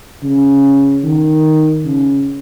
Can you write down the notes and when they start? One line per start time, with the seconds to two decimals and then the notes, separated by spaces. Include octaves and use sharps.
0.23 C#3
1.04 D#3
1.85 C#3